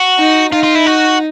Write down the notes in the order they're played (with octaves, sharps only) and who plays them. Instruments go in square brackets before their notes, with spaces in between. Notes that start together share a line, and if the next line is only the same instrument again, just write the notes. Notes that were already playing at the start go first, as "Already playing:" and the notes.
Already playing: [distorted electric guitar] F#4
[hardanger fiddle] D#4
[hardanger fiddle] D#4 [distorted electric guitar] F4
[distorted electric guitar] F4
E4
F#4